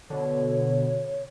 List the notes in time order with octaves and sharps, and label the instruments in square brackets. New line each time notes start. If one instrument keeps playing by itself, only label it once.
[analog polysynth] B2 D3 [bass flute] C#5